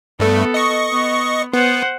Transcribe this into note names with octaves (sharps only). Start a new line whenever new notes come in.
G2 A3 B3 A4
D#5 C#6
B3
B3 C5 F#5